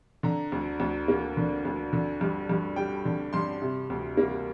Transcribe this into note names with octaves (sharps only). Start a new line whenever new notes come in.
D3 A#5
D2
D2
A#3
D3
D2
D3
G2
G2
G3 G5
D3
G2 C6
C3
D2
A#3